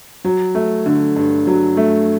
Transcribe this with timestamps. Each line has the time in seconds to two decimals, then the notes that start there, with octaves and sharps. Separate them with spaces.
0.25 F#3
0.55 A3
0.86 D3
1.16 G2
1.47 F#3
1.77 A3